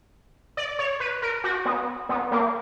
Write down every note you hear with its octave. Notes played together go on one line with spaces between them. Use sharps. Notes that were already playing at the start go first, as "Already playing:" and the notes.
D5
C#5
B4
A#4
F#4
B3
B3
A#3